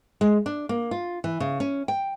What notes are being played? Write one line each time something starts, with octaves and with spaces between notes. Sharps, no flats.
G#3
D4
A#3
F4
E3
C#3
C#4
G5